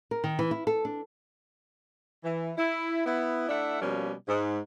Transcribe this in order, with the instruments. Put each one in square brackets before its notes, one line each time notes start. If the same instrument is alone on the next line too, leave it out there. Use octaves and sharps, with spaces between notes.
[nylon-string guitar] A#4
D#3
E3
E4
A4
D4
[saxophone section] E3
E4
B3 E4
A3 D4 E4 E5 F#5
B2 F3 G3 A#3 C#4
G#2